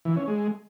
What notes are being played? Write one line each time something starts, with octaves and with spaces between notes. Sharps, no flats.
E3
C#4
G#3